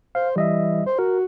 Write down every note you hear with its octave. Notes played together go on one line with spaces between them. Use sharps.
C5 F5
E3 G3 D#5 E5
C5
F#4 A#4